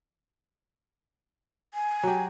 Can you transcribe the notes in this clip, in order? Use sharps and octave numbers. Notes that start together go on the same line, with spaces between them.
G#5
F#3 G4